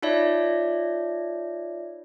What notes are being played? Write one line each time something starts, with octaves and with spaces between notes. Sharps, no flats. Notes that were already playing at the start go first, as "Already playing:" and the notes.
D#4 F4 C#5 D5 E5